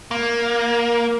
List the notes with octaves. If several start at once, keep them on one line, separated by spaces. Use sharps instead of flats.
A#3